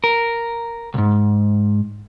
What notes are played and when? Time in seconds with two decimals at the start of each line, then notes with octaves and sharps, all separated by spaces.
0.04 A#4
0.94 C2 G#2